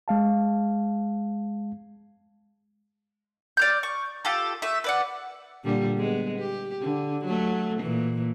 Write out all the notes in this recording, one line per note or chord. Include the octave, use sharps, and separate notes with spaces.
G#3 F5 A5
D5 F6 G6
C#6
F4 G4 A4
A3 E5
B4 D5 F#5
A#2 D3 G3
G#3 B3
G4
D3
F#3 A3
A#2 E3